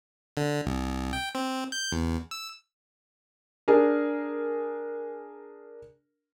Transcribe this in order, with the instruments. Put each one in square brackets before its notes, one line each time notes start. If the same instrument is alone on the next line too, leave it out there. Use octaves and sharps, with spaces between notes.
[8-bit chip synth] D3
C2
G5
C4
G6
E2
E6
[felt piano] D4 G#4 A#4